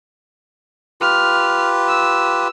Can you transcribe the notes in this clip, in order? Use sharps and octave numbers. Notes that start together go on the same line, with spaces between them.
F4 G4 B4 F6
E6